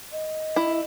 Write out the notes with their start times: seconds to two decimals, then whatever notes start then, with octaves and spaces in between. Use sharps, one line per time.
0.12 D#5
0.56 E4